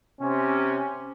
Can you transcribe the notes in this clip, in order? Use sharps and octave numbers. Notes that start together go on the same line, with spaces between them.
C3 C#4